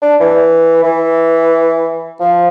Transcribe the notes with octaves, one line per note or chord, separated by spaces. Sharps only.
D4
E3
E3
F3